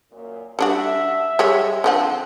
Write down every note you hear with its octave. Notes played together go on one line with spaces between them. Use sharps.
F#2 A#2
G3 D4 F#4 E5
G3 G#3 C#5
D3 F3 C4 F#5